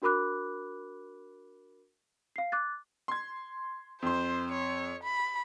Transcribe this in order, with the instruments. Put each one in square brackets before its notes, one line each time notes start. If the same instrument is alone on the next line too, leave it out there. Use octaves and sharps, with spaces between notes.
[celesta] D4 F#4 A#4 B5 D6 F#6
F5 C7
D6 F#6 A6
[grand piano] C6 G#6
[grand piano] F2 C6 [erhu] C5
[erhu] C#5
B5